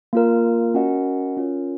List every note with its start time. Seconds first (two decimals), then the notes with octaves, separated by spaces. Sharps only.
0.13 A#3 F4 A#4
0.74 C#4 F#4 A#4 D#5 F#5
1.37 C#4 F4 A#4 C#5